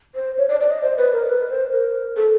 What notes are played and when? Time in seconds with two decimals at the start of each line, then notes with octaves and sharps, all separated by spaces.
0.15 C5
0.38 C#5
0.48 D5
0.60 D5
0.70 D#5
0.82 C5
0.97 B4
1.12 A#4
1.27 B4
1.49 C5
1.72 A#4
2.17 A4